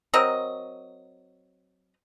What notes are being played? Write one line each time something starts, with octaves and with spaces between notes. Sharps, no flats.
F#3 C4 A#4 D#5